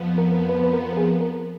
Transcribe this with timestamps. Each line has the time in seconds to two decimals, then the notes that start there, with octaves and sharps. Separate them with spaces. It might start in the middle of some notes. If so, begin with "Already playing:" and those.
Already playing: F2 F3 B3
0.18 A#4
0.49 B4
0.64 B4
0.73 A#4
0.93 A#4
0.97 G#4
1.21 A#4